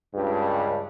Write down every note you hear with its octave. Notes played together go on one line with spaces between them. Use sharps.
C#2 G2